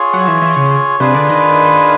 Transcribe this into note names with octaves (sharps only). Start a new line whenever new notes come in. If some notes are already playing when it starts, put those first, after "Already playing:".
Already playing: F4 G#4 C#5
F#3
E3
E3
C#3
C3 D4 F4 G#4 B4
D3
D#3